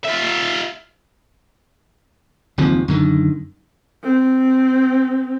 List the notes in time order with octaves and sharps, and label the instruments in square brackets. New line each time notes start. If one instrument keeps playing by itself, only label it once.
[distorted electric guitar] F4 E5
[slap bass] F#1 D#2 C3 F3
F#2 D3 D#3
[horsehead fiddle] C4